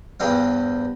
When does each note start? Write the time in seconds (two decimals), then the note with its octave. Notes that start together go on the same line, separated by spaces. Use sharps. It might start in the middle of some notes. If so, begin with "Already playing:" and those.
0.20 E2 G2 C4 F5